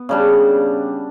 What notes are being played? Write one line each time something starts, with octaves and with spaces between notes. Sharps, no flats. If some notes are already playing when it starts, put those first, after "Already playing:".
Already playing: B3
C#3 G3 D4